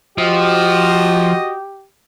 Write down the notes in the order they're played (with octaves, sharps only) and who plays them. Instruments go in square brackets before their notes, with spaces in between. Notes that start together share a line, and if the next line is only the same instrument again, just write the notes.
[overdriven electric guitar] F3 [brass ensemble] F#4 D#5 [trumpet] G4